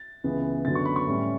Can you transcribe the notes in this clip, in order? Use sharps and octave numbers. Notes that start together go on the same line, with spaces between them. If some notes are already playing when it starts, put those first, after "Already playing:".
Already playing: A6
C#2 C#3 E3 B3
F#2 D3 F#3 B3 A6
C#6
B5
C#6
A2 G3 C#4